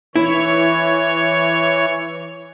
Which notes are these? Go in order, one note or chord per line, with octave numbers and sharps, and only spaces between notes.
E3 E4 C#5